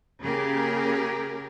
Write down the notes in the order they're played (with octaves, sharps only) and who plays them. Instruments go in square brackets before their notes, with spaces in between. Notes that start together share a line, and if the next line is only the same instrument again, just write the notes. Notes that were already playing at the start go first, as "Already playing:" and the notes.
[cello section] C#3 A#3 G4 G#4 A#4